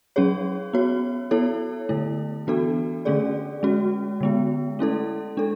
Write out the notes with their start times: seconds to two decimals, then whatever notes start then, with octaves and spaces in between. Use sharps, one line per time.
0.16 F#3 C#4 G#4 C#5
0.73 B3 F#4 C#5
1.31 B3 E4 A4 C#5
1.89 D3 A3 E4
2.47 E3 B3 D4 F#4 A4
3.05 D3 A3 C#4 G#4 D5
3.63 G#3 C#4 F#4
4.21 D3 G#3 B3
4.79 A3 C#4 E4 A4
5.37 G#3 D4 A4